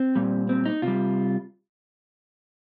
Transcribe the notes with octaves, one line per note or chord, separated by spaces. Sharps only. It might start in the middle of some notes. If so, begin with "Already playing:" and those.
Already playing: C4
A#2 G3
C4
D#4
C3 G3 F4